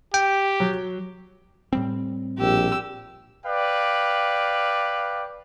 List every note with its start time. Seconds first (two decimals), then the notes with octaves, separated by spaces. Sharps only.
0.14 G4 G5
0.60 F#3
1.73 A2 G3 C4
2.39 A#1 G4 E6
3.45 B4 D5 F5 G5